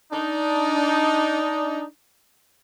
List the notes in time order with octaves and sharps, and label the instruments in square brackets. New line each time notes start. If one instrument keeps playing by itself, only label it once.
[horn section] D4 D#4